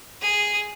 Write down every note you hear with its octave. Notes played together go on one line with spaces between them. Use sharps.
G#4